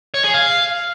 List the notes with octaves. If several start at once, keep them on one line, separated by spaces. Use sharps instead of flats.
C#5
G#4
F5